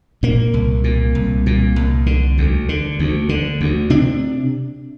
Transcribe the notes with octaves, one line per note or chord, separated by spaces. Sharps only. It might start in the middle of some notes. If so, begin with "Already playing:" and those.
A#2 A#3
C2
A#2
C2
A#2
C2
D3
D2
D3
D2
D3
D2
C3 D4